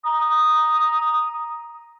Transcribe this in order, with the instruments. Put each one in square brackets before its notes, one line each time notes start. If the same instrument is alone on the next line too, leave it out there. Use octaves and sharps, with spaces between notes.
[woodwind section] A#5 D#6